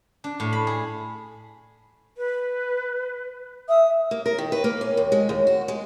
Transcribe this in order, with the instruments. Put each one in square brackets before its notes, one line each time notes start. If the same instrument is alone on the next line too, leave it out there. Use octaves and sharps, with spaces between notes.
[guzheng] D4
A2
B5
G#4
[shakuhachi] B4
[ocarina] E5 [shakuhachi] D#6
[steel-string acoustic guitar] A#3
A#4
D#3
B4
A#3
C#4
D#2
G#3
D#2
F#4
G#3